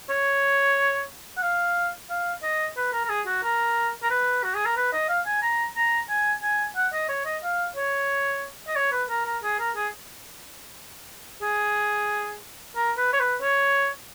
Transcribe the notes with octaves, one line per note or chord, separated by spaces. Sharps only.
C#5
F#5
F5
F5
D#5
B4
A#4
A#4
G#4
F#4
A#4
A#4
B4
F#4
G#4
A#4
B4
D#5
F5
G#5
A#5
A#5
G#5
G#5
F#5
D#5
C#5
D#5
F5
C#5
D#5
C#5
B4
A#4
A#4
G#4
A#4
G#4
G#4
A#4
B4
C#5
B4
C#5